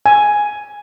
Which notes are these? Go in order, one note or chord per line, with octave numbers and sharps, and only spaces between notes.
G#5